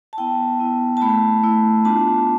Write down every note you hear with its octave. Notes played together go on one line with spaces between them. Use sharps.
A5
B3 E4 G5
B3 E4
A5
A3 E4 B5
A3 E4
B3 D4 F4 A5